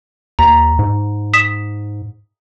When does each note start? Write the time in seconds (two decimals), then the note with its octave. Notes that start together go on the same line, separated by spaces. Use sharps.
0.39 D#2 A#5
0.79 G#2
1.34 D#6 B6 E7